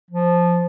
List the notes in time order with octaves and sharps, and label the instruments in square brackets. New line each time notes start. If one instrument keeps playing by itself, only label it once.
[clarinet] F3